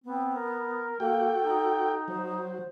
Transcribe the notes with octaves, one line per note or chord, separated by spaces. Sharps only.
B3 C4
A#4
A#3 F#4 A4 G5
D#4
F#3 C5